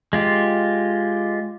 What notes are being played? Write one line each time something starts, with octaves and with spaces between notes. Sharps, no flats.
G#3 F4 G4